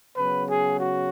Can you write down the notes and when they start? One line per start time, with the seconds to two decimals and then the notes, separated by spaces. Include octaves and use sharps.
0.16 C#3 F#3 B3 B4
0.48 G#4
0.79 F#4